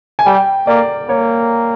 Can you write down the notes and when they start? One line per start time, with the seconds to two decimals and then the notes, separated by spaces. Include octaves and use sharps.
0.19 G#5
0.26 G3 G5
0.67 A#3 D5
1.09 A#3 C#5